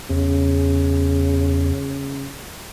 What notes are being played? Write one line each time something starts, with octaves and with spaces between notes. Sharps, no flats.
E2 C#3